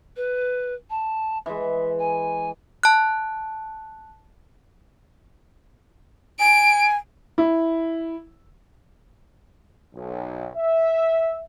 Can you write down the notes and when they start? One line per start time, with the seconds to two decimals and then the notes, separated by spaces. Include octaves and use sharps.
0.16 B4
0.90 A5
1.46 E3 G#3 E5
1.98 G#5
2.83 A5 F#6
6.40 G#5 D7
7.38 E4
9.94 B1
10.55 E5